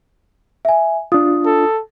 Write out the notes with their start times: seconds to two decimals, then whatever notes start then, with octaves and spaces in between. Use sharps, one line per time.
0.65 E5 G#5
1.12 D4 F4 D#6
1.46 A4